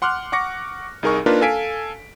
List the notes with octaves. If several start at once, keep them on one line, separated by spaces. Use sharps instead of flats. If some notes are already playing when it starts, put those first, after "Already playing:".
F#5 C6 D6 F6 F#6
F#5 C#6 D6 A#6 C#7
C2 D#4 G#4 A#4 G#5 C#6
A#3 D4 D#4 F4 A#4 B4
A4 F5 G#5 B6 D7